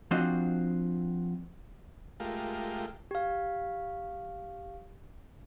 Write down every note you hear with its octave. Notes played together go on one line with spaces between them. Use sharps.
F3 C4 D4 F4 F#4 D#5
G#3 A3 F4 G4 A#4
G4 F5